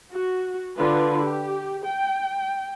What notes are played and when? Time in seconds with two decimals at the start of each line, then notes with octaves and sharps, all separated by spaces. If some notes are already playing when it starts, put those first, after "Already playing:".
0.11 F#4
0.76 D3 F4 B4
1.23 G4
1.85 G5